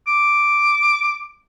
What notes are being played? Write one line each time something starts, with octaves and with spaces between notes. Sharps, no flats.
D6